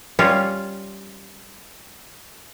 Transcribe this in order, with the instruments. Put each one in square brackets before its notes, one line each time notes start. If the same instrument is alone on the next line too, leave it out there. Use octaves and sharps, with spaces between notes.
[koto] G3 C#4 F4